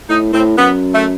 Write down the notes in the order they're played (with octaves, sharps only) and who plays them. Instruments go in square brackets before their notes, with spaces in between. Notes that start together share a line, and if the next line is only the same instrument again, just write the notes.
[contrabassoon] A2 [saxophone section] D#4
[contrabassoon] A2 [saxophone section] C4
[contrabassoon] F#2 [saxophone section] B3
[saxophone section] A3